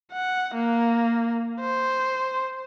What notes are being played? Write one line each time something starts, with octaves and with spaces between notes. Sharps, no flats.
F#5
A#3
C5